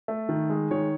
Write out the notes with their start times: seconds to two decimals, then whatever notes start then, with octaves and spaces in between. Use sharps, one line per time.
0.08 A3
0.29 D#3
0.50 G#3
0.71 D#3 C#5